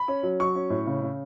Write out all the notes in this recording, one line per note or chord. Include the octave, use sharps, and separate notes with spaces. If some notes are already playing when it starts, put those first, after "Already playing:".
Already playing: B5
C#4
F#3
F#3 C#6
C#4
A2
C#3
C#3